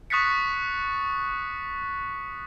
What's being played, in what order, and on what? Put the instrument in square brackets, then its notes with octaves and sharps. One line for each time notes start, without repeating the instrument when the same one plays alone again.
[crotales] C#6 D#6 F#6 A6 B6 C#7